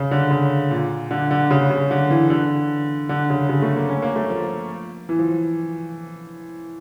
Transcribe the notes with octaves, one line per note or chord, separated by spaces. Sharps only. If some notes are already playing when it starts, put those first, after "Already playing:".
Already playing: C#3
D3
C#3
A#2
D3
D3
C#3
C#3
D3
E3
D3
D3
C#3
C#3
A3
A#3
C#4
A#3
A3
F3
E3
F3